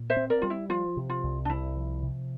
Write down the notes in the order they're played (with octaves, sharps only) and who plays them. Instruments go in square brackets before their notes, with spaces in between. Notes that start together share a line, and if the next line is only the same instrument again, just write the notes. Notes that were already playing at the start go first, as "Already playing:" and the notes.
Already playing: [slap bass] A#2
[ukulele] C5 E5
[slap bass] C4
[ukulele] A#4 D5
[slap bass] G3 [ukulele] F4
[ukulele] E4
[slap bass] F3 [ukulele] F4
[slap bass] C3
[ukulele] F4
[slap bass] C2
[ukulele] D4
[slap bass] C2 [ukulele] E4
[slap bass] F3
C3